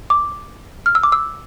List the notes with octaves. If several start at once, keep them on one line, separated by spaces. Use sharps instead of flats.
D6
F6
E6
D6
E6